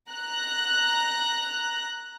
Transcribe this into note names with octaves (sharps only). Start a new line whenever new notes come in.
A#5 F#6